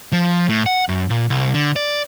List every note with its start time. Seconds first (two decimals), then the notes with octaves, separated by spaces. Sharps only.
0.12 F3
0.49 A2
0.66 F#5
0.89 F#2
1.10 A#2
1.30 C2
1.54 D3
1.76 D5